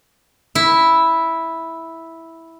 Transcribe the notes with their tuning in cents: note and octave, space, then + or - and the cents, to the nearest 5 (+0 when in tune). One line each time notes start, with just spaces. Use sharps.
E4 -5